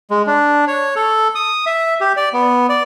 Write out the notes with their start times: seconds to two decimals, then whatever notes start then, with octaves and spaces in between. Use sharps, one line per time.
0.10 G#3
0.27 D4
0.67 C#5
0.96 A4
1.35 D#6
1.66 E5
2.01 G4
2.17 D5
2.33 B3
2.69 D5